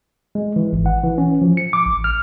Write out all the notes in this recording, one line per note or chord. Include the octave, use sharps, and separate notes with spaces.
G#3
E3
G#1
F#5
E3
C#4
F3
C#7
D6
A1
F6